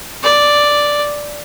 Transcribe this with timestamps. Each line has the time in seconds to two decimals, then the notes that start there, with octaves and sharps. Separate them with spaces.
0.23 D5